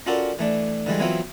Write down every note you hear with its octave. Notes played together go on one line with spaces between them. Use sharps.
C#4 F4 F#4 A4 A#4 D5
E3 A3 D4
D3 E3 G3 G#3
E3 F#3 B3 C4 E4 F4